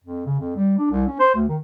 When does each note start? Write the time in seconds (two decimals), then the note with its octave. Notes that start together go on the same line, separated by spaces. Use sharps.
0.04 F2
0.26 C#3
0.39 F2
0.56 G3
0.78 D4
0.90 C2
1.07 C#4
1.19 C5
1.35 D2
1.48 D#3